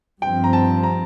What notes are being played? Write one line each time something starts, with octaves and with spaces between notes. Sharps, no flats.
G2 F3 C4 G5
A#5
A5
A#5